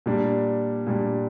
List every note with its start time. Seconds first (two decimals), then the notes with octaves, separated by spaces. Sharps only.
0.06 A#2 G3 D4
0.87 A#2 G3 D4